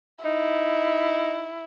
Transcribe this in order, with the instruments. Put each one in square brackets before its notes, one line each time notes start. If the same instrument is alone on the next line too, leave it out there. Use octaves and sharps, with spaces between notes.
[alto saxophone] D#4 [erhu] E4